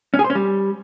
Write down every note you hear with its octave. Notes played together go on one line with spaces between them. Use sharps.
C#4
G#4
C5
C#4
G3